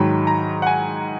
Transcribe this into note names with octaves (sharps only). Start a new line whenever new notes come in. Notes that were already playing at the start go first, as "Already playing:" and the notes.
Already playing: G#2 D#3 F#3 B5
A#5
F#5
G#5